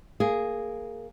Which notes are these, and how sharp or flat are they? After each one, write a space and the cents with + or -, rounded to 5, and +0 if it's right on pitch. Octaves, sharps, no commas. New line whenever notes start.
A#3 -10 G#4 +0